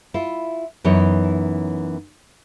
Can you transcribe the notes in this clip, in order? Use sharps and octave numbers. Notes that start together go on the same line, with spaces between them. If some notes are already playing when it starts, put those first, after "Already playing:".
E4 F4
F#2 E3 B3 D#4 C#5